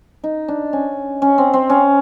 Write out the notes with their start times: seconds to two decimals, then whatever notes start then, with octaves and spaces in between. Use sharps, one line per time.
0.24 D#4
0.48 D4
0.73 C#4
1.22 C#4
1.38 C4
1.53 C4
1.70 C#4